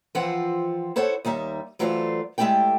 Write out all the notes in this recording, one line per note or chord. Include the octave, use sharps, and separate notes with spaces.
E3 F3 C4 F4 F#5
E4 A4 C5 C#5 F#5
D#2 G3 D#4 E5
E3 F#3 A3 F4 C5 D5
G#3 A3 E4 G4 D5 G5